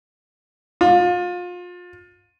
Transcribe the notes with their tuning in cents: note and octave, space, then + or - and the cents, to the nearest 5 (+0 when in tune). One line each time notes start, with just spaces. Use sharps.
F4 +30